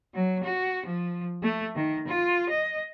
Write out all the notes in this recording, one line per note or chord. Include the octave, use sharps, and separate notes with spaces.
F#3
F#4
F3
A3
D#3
F4
D#5